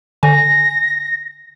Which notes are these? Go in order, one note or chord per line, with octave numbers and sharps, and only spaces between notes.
D3 G#5 A#6